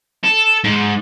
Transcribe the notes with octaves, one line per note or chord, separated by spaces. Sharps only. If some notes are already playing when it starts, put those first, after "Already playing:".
A4
G#2